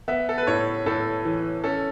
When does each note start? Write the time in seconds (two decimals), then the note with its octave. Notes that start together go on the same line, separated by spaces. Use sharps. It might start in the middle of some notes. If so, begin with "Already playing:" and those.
0.08 B3 E5
0.29 A4
0.38 B4
0.47 A2 C#5
0.86 A2 A4
1.25 E3
1.64 C#4 A4